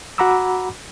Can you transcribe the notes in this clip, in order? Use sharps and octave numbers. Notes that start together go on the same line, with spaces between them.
F#4 F#5 A#5 B5 D6 E6